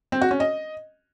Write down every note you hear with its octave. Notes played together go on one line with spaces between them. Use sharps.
C4
F#4
C#4
D#5